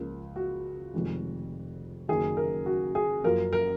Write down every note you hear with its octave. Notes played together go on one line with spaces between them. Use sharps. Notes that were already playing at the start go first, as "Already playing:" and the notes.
Already playing: C#2 C#3 F3 A#3
F#4
F1 F2 D#3 G#3
F#1 F#2 D#3 G#4
A#4
F#4
G#4
F#2 F3 A#3 A#4
A#4